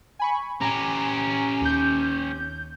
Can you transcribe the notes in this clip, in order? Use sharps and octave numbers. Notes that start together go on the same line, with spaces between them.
G#5 B5 C#6
C#4 G4 G#5 A#5
D#2 G6